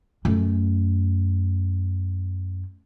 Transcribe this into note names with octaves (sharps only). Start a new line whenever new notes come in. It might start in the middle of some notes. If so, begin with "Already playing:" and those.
F#2 A3